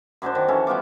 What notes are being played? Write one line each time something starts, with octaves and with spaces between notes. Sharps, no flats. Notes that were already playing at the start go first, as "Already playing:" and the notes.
F#2 F#3 D4 C5
D#3
E3 C#4 A4
G3 B3 F4 D6